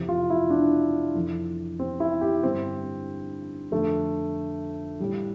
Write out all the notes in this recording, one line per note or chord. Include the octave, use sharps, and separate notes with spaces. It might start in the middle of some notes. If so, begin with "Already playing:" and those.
Already playing: F2 C3 E3
F4
E4
D4
F2 E3
C4
E4
G4
G2 D3 C4
F2 D3 A3
A2 E3 G3